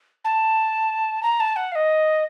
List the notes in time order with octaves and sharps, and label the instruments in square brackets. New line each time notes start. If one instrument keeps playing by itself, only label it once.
[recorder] A5
A#5
A5
F#5
F5
D#5